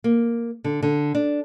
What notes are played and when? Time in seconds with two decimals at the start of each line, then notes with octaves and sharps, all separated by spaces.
0.04 A#3
0.64 D3
0.83 D3
1.15 D4